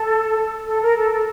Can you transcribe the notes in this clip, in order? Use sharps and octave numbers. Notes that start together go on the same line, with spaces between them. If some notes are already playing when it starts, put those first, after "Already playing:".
Already playing: A4
A4
A#4
A4
A4